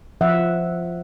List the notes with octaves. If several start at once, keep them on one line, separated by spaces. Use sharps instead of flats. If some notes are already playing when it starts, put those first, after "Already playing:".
F3 E5 F#5